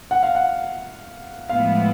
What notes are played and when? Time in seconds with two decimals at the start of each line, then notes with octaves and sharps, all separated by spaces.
0.11 F#5
0.23 F5
0.35 F#5
1.49 A2 F3 G#3 B3 E4 F5